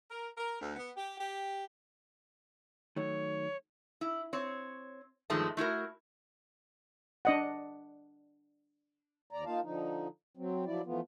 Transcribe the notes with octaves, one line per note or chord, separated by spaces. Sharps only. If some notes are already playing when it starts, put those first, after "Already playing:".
A#4
A#4
D2
B3
G4
G4
D#3 F#3 A3 C#5
E4
C4 C#5
G2 D#3 F3 G#3 A3 A5
A3 E4 F#4 A#4
D4 D#5 F#5
D#2 D5 A#5
A#3 D#4 F4 F5 A5
D3 F3 D#4
F#3 C4
F3 F#3 E4 D5
E3 F3 A3 B3 F4